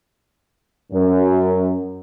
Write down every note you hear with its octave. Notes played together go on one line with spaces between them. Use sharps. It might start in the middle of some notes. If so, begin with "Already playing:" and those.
F#2